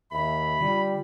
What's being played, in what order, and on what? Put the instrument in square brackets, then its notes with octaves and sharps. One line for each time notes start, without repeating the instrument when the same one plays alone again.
[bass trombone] D#2 [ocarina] E5 [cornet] B5
[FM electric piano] D3 [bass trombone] G3 [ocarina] F4